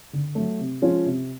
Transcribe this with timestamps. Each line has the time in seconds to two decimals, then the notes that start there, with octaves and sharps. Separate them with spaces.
0.13 D3
0.35 F#3 A3
0.59 C3
0.82 F3 G#3 C#4 F4
1.06 C3